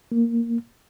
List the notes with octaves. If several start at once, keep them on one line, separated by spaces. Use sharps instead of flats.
A#3